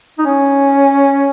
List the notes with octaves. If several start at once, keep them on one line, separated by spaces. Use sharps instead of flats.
D#4
C#4